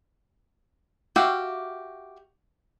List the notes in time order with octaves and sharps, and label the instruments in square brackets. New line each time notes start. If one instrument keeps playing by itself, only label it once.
[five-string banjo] F#4 G4 E5 F5